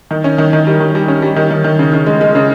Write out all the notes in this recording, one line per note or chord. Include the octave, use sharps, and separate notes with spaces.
D#3
C#4
D#3
D#3
G3
D#3
G3
C#4
G3
D#3
D#3
D#3
C#3
C#3
G#3
G#3
C#3